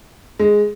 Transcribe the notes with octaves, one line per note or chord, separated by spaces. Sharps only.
G#3